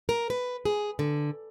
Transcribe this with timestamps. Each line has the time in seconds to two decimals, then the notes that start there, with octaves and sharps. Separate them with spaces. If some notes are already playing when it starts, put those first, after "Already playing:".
0.09 A#4
0.30 B4
0.65 G#4
0.99 D3